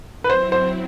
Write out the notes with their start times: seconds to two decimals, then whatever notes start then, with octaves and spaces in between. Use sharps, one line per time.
0.24 B4
0.29 F#3 C4 E4 C5
0.52 C5